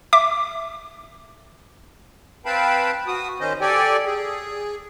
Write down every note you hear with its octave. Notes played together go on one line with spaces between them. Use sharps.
E5 D6
C4 B4 F5 G5 A5 B5
F#4 D#6
D#3 C#4 C5 D#5
G4 A4 D5 G5 G#5
G#4